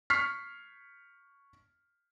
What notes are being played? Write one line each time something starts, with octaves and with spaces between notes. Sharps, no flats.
C#6 F6 B6 C7